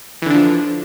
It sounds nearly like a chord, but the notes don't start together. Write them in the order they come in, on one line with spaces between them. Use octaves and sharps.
E3 D3 D4 F3